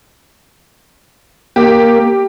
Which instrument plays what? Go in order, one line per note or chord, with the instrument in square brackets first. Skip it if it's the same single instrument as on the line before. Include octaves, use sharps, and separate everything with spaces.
[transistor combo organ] A#3 [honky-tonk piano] G4